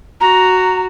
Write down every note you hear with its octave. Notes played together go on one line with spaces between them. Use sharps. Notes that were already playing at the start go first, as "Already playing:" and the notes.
F#4 A#5